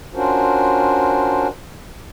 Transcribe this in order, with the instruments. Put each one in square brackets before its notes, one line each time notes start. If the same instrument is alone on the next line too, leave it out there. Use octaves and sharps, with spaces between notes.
[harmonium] C#4 D4 F4 F#4 A#4 C5